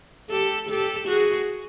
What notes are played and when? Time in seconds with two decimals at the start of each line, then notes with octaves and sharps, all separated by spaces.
0.30 G4 A4
0.69 G4 A4
1.08 F#4 G#4